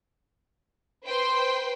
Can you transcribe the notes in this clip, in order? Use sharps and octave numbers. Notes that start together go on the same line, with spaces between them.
B4 C5 G5 C6